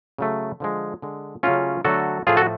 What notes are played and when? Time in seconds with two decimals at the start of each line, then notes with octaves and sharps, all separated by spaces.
0.18 C#3 F#3 A3
0.60 D3 F3 G#3
1.02 D3 G#3
1.43 C#3 F#3 A3 C#4 F4
1.85 D3 F#3 A3 F#4 A4
2.27 A2 F3 A3 F4 G#4
2.37 F#4 A4